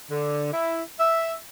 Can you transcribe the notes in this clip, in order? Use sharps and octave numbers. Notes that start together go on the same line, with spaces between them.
D3
E4
E5